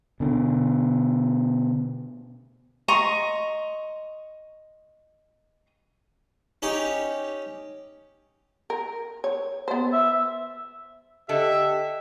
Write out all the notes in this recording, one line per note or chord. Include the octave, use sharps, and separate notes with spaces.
B2 D3
D#5 A#5 C6 C#6
C#4 D#4 G4
A#4
C#5
B3 C5
E5
D3 G4 A4 D#5 E5